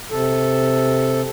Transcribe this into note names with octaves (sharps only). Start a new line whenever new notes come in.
C3 A4